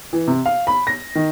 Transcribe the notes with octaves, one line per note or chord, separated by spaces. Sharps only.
E3
C3
F5
B5
A#6
D#3